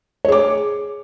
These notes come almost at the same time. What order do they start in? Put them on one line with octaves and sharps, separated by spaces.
C#5 G#4 D6